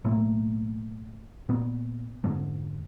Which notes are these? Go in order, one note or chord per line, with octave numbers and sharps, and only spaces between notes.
B1 A2 A3 A#3
A#2 B3
F2 G#2 D3 G#3